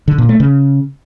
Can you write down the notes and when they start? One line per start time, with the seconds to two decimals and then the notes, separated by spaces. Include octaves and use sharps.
0.08 D3
0.18 A#2
0.29 A3
0.40 C#3